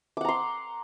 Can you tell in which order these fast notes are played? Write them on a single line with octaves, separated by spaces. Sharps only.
D6 F#5 A#5 C6